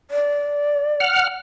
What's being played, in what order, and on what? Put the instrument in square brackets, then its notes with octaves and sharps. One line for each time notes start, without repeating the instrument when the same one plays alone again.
[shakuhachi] D5
[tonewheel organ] F#5 F6